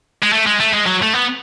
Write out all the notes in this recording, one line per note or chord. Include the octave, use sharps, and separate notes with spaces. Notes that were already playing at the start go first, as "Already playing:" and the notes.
G#3
A3
G#3
A3
G#3
F#3
A3
B3